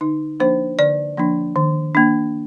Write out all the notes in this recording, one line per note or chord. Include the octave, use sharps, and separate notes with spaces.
D3 D#4
F3 A#3 D4 C5
D3 D5
F3 A#3 D4
D#3
A#3 D4